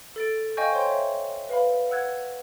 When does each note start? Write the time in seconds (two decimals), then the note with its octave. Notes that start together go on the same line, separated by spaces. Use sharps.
0.16 A4 A6 D7
0.57 D#5 F5 G5 G#5 C#6 G6
0.72 C5 C#5 G5 C6
0.86 C#5 E5
1.49 B4 F5 B5
1.90 F#5 E6 F#6 G#6